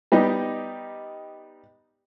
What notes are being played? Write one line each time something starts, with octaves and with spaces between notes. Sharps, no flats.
G3 B3 D#4 G4 D#5